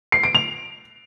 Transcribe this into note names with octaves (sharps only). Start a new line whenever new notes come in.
C7
D7
F7